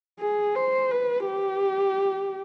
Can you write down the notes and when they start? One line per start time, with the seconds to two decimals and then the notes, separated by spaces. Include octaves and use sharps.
0.20 G#4
0.55 C5
0.91 B4
1.26 G4